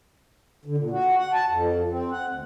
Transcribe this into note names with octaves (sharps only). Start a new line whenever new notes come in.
D3
A#2
F#4
F#5
A5
F2
C4
F#5
D2